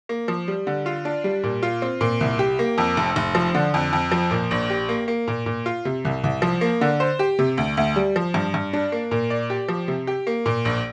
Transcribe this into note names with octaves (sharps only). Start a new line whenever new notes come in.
A#3
F3
G3
D3
F4
D4
G3
A#2
F4
C4
A#2
C2
G4
A#3
F2
F1
F1
F3
D3
F2
F2
F3
A#2
A#1
G4
A#3
A#3
A#2
A#2
F4
C3
C2
C2
F3
A#3
D3
C5
G4
C3
D2
D2
G3
F3
G2
G2
D4
A#3
A#2
D5
G4
F3
C3
G4
A#3
A#2
A#1